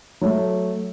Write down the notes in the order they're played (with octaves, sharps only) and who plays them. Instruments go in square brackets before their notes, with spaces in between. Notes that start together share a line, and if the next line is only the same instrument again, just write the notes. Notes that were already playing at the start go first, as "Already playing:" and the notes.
[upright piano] F#3 A3